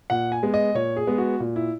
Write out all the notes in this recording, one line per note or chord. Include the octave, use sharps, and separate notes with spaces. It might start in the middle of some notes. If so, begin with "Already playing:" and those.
A#2 F#5
G#5
G#3 B3
D#5
A#2 C#5
G#4
G#3 B3
F#4
A#2
E4